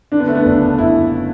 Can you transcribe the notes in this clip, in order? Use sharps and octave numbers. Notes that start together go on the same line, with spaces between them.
D3 D4
B3
A3
B3
F#1 D4
F#1 E4